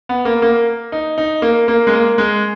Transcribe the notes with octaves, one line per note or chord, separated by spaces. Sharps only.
B3
A#3
A#3
D#4
D#4
A#3
A#3
G#3
A#3
G#3